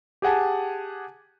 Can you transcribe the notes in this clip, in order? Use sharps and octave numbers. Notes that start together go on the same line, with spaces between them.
G4 G#4 F#5 G#5 A5